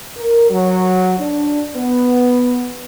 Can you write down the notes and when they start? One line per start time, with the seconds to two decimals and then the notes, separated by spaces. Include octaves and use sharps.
0.17 A#4
0.50 F#3
1.20 D4
1.76 B3